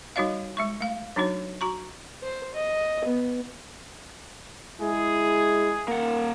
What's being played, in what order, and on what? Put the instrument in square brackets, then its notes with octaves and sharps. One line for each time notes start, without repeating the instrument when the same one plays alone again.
[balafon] G3 D#4 F#4 C#5 D#5 F5
G#3 E5 C#6
A3 F5
F#3 D4 D#4 F#4 C#5
F#4 A#5 C#6
[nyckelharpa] C5
D#5
B3
[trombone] G#3 [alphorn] E4 [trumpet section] G#4
[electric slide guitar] A#3 F#5 [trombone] A#4